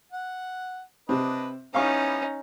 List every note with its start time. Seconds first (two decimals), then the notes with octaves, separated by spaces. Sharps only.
0.12 F#5
1.09 C3 C4 D4 B4 D#5
1.75 G3 B3 C#4 D#4 E4 F5 C#6